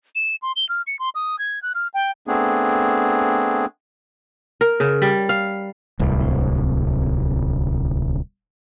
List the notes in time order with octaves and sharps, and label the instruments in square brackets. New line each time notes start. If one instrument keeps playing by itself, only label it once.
[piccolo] E7
C6
G7
F6
C#7
C6
D#6
G#6
F#6
F6
G5
[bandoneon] A3 B3 C4 D4 G#4
[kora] A#4
C#3
G3
F5
[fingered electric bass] D1 C2